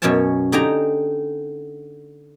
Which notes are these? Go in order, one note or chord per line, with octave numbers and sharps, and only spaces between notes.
F#2 B2 C#4 C#5 G#5 A5
D3 D#4 G4 D#5 G#5 A#5